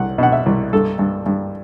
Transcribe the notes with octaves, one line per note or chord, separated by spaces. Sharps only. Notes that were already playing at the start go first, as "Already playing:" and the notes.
Already playing: C2 F#5
B2 F#5
E5
C2
G2 A4
G2
G2